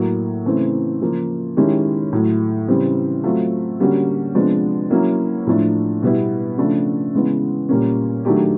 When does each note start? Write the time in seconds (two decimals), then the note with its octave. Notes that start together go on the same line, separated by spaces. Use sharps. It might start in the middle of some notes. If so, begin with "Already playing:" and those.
Already playing: A2 F#3 A#3
0.46 C#3 E3 A3 C4
1.01 C#3 F3 A#3
1.57 D#3 G#3 C#4 E4 G4
2.13 A2 F#3 A3
2.68 C#3 E3 G3 C4
3.24 F#3 A3 C4 F4
3.80 D3 G3 A#3 C#4 F#4
4.35 C3 F3 G#3 B3 D4
4.90 F#3 A#3 C#4 E4
5.46 A2 F3 A3 D4
6.02 B2 G3 B3 E4
6.58 C#3 F3 A3 D4
7.14 C#3 E3 G#3 B3
7.69 A#2 G3 A#3 C#4
8.25 D#3 F#3 A3 D4 G4